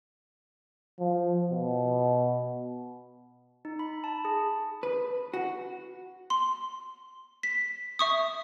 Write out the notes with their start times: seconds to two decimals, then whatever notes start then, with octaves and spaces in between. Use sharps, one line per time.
0.99 F3
1.51 B2
3.65 D#4
3.79 B5
4.04 A5
4.25 G#4
4.83 B4
5.34 F#4
6.30 C6
7.43 B6
7.99 E5 C#6 D#6